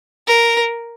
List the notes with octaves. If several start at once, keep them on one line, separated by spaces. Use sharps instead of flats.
A#4